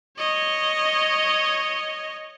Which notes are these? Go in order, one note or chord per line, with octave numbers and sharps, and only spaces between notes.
C#5 D#5